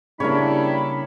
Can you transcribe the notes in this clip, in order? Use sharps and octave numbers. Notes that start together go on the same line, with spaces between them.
C#3 G3 A#3 D4 E4 A#4 C#5 B5